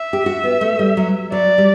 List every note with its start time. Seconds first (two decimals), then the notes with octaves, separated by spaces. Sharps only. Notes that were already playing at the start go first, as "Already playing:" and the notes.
Already playing: E5
0.13 G4
0.26 F#4
0.44 B3
0.61 A3
0.79 G3
0.97 F#3
1.32 F#3 D5
1.58 G3